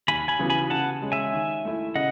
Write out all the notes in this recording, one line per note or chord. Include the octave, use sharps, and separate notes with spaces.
D#2 G#5 B5
G#5 B5
C#3 E3 B3 F#4
G#5 B5
C#3 F#5 A5
G#3 C#4
E5 G#5
D#3
A3 E4
C#3 D#5 F#5